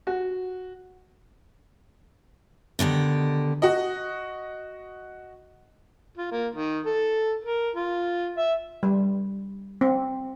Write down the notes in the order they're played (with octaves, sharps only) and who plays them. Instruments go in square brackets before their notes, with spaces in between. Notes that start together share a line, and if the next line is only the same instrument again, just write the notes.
[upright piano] F#4
[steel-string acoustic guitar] B2 D3 D#3 G4
[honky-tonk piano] F#4 D#5
[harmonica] F4
A#3
D#3
A4
A#4
F4
E5
[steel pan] G3
C4